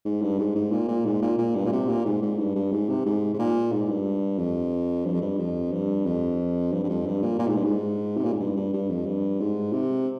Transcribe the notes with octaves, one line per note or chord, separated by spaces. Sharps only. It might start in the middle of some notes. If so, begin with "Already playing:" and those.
G#2
G2
G#2
G#2
A#2
A#2
G#2
A#2
A#2
G2
A#2
C3
A#2
G#2
G#2
G2
G2
G#2
C3
G#2
G#2
A#2
G#2
G2
F2
G2
F2
G2
F2
G2
F2
G2
G2
F2
G2
A#2
A#2
G#2
G2
G#2
C3
A#2
G#2
G2
G2
G2
F2
G2
G#2
C3